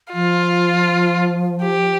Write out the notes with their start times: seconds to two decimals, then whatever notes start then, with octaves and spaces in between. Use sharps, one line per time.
0.14 F3 F4
1.62 G4